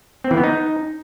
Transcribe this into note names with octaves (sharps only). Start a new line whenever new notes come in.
C4
E3
B3
D#4